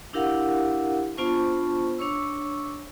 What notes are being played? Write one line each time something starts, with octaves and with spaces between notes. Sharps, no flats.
D4 E4 G4 A#4 F5 F#5
B3 D4 F4 C5 A5 C#6
D4 C#5 C#6 E6